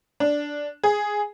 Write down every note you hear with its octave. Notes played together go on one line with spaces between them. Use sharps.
D4
G#4